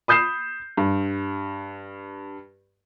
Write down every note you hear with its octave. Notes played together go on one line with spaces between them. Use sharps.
B5 D#6 G6 C7 E7
G2